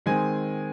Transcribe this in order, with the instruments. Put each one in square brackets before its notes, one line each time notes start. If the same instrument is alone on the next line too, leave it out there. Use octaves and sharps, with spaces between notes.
[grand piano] D#3 G#3 C4 G#5